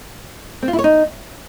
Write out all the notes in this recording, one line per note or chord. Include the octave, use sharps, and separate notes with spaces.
C4
F4
E4
C#5
D#4